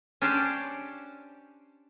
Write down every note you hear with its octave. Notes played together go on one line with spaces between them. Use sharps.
C#4 D4 G4 C5 D5